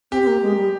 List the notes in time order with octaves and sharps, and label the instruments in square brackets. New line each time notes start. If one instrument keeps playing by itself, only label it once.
[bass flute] C4 [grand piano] G4
[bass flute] C4
A#3
G#3
G3